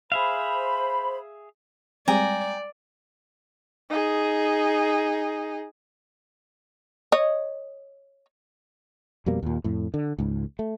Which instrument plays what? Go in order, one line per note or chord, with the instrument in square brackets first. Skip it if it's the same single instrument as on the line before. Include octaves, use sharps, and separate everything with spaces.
[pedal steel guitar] G#4 E5 F5 [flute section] C5 B5
[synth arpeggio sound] G3 G#3 C4 [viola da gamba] D5 [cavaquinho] G5 G#5 A#5
[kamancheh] D#4 G#4
[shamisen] C#5 D#5
[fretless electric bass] F2 B2 G3 A#3
D#2 A#2
F2 A2
D3
C#2 G#2
A3